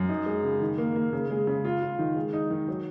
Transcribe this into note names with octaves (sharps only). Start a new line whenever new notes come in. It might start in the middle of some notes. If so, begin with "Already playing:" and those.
Already playing: F#2
D#4
G#3
C#3
D#3
A#3
A#3
C#3
G#3
C#3
F4
F4
D#3
G#3
D#4
D#3
F#3